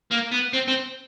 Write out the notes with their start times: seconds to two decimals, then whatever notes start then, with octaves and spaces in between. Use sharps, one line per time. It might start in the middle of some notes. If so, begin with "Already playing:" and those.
0.11 A#3
0.31 B3
0.53 C4
0.68 C4